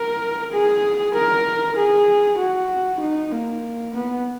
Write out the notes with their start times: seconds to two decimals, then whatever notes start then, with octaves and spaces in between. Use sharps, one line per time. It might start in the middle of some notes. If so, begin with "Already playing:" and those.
Already playing: A#4
0.53 G#4
1.15 A#4
1.77 G#4
2.39 F#4
3.01 D#4
3.32 A#3
3.94 B3